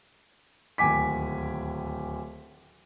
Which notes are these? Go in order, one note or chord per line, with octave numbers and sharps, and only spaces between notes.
D1 D#2 G#5 D6 B6